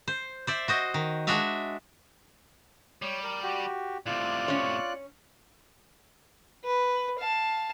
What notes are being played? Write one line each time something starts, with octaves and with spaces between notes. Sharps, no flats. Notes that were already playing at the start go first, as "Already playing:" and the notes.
C5
C5 D5 E5
F#4 C5 D#5
D#3
G#3 D4 F#4 E5 F5
G3 C#5
A#4
F#4 G4
A2 C3 F4 D5 F#6
C#4 C#5
B4
F5 A5